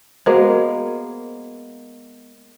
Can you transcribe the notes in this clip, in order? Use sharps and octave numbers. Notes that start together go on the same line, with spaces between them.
G#3 A#3 B3 F#4 A#4 C5